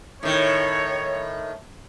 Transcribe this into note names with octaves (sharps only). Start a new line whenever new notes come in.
A2 D#3 C#5